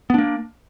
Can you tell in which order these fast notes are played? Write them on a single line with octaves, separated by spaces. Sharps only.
B3 D4 A#3